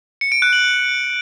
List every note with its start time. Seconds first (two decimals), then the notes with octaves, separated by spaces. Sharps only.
0.21 C#7
0.32 D7
0.42 F#6
0.53 F#7